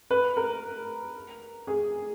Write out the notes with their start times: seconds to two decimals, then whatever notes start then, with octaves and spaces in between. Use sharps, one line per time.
0.11 B4
0.37 A#4
1.67 G#4